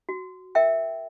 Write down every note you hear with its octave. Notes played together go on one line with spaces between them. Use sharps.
F#4
A#4 E5 G5